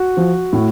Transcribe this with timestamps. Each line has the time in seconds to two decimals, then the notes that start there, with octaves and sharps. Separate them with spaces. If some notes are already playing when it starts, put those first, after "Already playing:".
Already playing: F#4
0.17 F3
0.53 A2